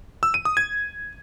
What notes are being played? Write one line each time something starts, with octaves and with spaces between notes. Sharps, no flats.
E6
D#7
D#6
G#6